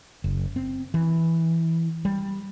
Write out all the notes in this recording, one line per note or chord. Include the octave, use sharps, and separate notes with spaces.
F#1
C4
E3
G3